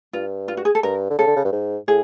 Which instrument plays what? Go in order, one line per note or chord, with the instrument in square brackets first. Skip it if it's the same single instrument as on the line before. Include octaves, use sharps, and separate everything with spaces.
[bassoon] G2 [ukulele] F4
[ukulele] F4
F#4
G#4
A4
[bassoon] G2 [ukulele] A#4
[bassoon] D3
[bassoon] C#3 [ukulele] A4
[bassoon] D3
C#3
G2
G#2
[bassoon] A2 [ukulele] G#4